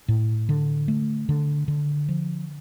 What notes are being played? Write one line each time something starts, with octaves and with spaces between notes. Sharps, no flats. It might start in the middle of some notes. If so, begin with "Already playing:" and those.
A2
D3
A3
D3
D3
F3